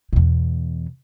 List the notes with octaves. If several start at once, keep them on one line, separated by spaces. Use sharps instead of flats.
E2 B2